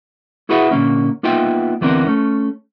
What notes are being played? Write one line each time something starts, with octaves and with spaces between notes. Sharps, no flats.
E4 F#4 G#4 B4 E5 F#5
A#2 D3 A#3 C#4
A#3 B3 D#4 F4 E5 G5
D2 E3 B3 C4 D4 A#4
A3 C#4